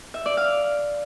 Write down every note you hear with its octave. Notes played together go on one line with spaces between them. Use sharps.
E5
D5
F5